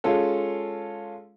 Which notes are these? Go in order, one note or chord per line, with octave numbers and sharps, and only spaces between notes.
G#3 C#4 F4 A4